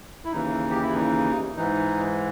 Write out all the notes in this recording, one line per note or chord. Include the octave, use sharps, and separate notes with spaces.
E4
D#2 C#3 E3 D#4
G4
E4
D#4
G#2 E3 D#4